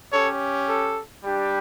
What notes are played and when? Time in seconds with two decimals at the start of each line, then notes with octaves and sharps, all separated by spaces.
0.13 C#4 G4 A4 C#5
0.68 A4
1.24 G3 D4 G4